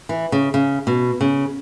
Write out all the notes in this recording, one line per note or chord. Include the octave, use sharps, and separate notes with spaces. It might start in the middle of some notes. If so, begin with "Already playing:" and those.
E3
C#3
C#3
B2
C#3